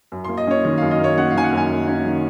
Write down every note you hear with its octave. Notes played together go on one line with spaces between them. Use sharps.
F#2
C6
A#3
D#5
C#4 C#5
D#3 D#5
F5
F#2
D#5
A#3 C#5
C#4 F#5
F5
D#3 G#5
F#5
F#2 G#5
A#3
C#4
D#3